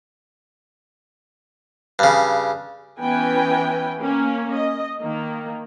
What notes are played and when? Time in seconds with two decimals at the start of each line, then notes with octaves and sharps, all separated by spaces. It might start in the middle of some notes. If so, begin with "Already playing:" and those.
1.99 G2 C#3
3.00 E3 B3 C#4 B4 G5 G#5
4.01 A#3 C#4
4.53 D#5
5.02 D#3 A#3